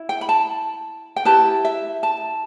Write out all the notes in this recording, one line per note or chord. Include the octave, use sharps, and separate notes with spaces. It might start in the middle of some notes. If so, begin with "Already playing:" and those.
Already playing: E4
G5
B5
A5
G5
E4 G4 B4 A5
E5
A5